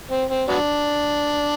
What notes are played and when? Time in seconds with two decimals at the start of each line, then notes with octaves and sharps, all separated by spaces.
0.11 C4
0.30 C4
0.49 F#3 B3 D4